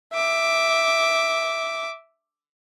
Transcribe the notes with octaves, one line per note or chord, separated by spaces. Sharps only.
E5 D6